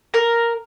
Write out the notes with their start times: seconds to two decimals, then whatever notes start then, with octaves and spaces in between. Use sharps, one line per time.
0.14 A#4